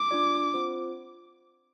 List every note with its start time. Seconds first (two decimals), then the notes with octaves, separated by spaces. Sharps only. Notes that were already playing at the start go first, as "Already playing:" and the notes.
Already playing: D6
0.11 D4 F4 D5
0.54 C4 F4 C5